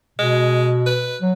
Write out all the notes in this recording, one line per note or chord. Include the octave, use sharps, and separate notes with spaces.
B2 G#3
B4
F#3